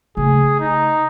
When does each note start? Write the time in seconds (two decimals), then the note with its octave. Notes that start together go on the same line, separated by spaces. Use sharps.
0.17 C#3 A3 G#4
0.60 D#4